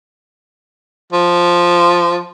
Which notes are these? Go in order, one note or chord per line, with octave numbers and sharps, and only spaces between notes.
F3